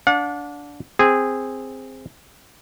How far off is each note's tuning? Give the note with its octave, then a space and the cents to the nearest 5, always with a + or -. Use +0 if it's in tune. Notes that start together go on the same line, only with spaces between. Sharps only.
D4 -15 F#5 -45
C4 +0 G#4 -10